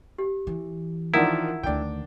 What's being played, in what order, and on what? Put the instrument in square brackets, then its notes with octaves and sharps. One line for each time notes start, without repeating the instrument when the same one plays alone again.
[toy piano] G4
[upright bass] E3
[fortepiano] D#3 F3 D4 [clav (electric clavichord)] E4 [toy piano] A#4 F#5 A#5
[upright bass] D2 D#3 [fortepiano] D4 G5